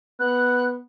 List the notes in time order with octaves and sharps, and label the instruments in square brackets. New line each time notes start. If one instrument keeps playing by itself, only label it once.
[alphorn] B3 [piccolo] F#6